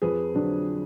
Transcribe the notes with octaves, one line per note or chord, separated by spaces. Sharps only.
F2 G#4 B4
D3 F#3 D4